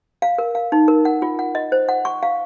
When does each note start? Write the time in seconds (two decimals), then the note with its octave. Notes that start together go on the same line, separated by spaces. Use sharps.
0.22 F5
0.38 A#4
0.55 F5
0.72 D#4
0.88 A#4
1.05 F#5
1.22 F4
1.39 F#5
1.55 D#5
1.72 C5
1.88 F#5
2.05 C#6
2.23 F5